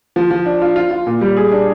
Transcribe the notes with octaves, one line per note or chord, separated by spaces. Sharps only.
F3
F3
D4
F4
F4
F4
A#2
G3
G#4
D4